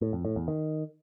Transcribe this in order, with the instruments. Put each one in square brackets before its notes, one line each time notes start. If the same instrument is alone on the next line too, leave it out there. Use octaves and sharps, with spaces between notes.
[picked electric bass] A2
F2
A2
E2
D#3